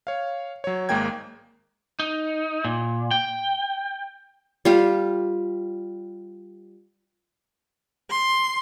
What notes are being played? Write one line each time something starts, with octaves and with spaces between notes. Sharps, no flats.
C#5 F5
F#3 C#5
G#1 G#3 A#3 G5 G#6
D#4
A#2
G5
G3 F4 G4
C6